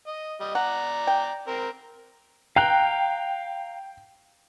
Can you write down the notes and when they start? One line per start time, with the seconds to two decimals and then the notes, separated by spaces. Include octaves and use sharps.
0.07 D#5
0.41 G3 D#5
0.55 D5 F#5 A#5
1.07 G5
1.48 C4 A#4
2.56 F5 G5 A#5 F#6